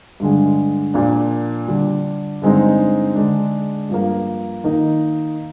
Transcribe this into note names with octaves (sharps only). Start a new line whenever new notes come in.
G2 D3 G#3
A#2 F3 A#3 D4
D3 G3 D4
G2 D3 G#3 C4 D#4
D3 G#3 D4
G2 F3 A#3
D#3 A#3 D#4